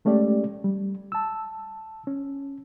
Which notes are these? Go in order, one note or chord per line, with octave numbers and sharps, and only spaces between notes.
G#3 A3 C#4 G4 D5
G3
A5 E6
C#4